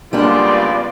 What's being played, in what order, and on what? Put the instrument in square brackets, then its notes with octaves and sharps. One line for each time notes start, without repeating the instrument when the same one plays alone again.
[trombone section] C#2 B3 [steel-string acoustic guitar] G3 A#3 D4 [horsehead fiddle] F4 D5